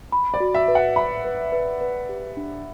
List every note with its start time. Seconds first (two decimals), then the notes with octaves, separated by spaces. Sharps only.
0.12 B5
0.34 D5
0.40 F#4
0.54 E5
0.68 B4
0.75 F#5
0.96 E5 B5
1.25 B4
1.52 B4
1.81 B4
2.09 G4
2.37 D4